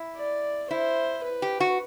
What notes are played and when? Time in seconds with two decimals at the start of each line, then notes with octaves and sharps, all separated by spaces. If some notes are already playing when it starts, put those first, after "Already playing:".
Already playing: E4
0.16 D5
0.70 E4 C5
1.24 B4
1.42 G4
1.60 F#4